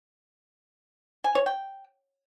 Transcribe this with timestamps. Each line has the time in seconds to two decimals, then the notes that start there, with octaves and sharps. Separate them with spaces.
1.24 G#5
1.35 C#5
1.46 G5